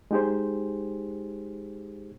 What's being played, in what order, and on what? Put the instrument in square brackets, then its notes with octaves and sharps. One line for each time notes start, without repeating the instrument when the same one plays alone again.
[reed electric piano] G#3 D#4 G4 G#4 C5